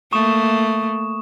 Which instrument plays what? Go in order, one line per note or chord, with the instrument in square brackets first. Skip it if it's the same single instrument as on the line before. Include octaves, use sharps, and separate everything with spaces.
[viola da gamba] A3 A#3 [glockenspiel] C#6 D#6 E7